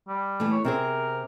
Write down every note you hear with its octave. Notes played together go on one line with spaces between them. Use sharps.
G3
E3 A3
C#5
C3 C4 G#4 A#4